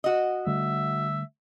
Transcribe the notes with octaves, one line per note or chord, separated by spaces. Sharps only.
F#4 D#5
D3 G3 A3 E5